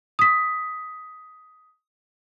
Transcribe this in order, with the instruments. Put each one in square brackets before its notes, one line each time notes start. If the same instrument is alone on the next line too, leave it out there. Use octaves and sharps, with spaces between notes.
[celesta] D#6 B6